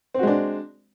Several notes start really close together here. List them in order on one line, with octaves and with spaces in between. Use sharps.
C4 F#4 G#3 D4